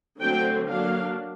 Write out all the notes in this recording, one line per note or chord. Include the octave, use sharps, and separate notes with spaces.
D3 F#3 A3 C4 G5
F#3 A#3 D4 F5